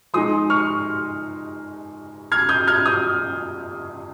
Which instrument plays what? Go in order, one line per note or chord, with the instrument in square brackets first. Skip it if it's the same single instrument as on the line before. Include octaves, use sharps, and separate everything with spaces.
[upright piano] F3 G#3 D#4 C6 D#6
C#6 F6
F6 G#6
D#6 G6
F6 G#6
D#6 G6